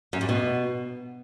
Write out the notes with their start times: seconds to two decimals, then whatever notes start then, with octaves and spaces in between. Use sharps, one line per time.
0.13 F#2
0.21 G2
0.29 B2